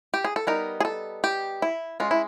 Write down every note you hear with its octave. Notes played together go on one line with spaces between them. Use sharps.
G4
G#4
A4
G3 B3 D#4 A#4
G#4
A4
G4
E4
G#3 C#4 F4
E4